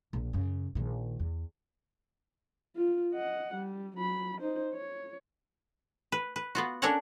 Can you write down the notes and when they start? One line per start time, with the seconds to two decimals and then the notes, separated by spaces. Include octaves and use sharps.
0.13 A#1
0.33 F#2 C#3
0.75 A#1 D#3
1.20 E2
2.76 F4
3.13 D#5 F#5
3.54 G3
3.97 F#3 B5
4.41 D#4 C5
4.73 C#5
6.12 B4
6.36 B4
6.55 B3 F4 F#4
6.82 C#4 D4 A4 A#4 C#5 F#5